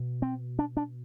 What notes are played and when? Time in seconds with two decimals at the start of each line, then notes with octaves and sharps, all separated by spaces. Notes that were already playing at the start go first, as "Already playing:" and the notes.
Already playing: B2
0.22 C4
0.59 D4
0.77 D4